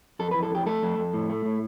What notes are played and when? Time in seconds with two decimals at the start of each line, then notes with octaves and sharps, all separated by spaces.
0.19 F2 A4
0.31 E3 B4
0.43 A4
0.51 F2 G4
0.66 A3 A4
0.82 F2
0.98 F2
1.14 A2
1.30 A3
1.45 A2